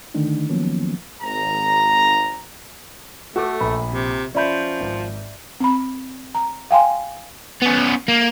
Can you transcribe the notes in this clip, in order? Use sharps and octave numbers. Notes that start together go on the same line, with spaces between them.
D3 D#3 A3 D4 D#4
D#3 F3 F#3 A#3 B3 C#4
G#1 A#5
A3 F#4 A4 D6
A#1 B5
C3
F3 C#4 D5 E5 B5 G6
G#1
C4 B5
A#5
F5 G5 G#5 C6
B3 C#4
A#3